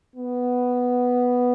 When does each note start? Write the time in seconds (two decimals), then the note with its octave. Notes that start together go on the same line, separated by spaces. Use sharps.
0.16 B3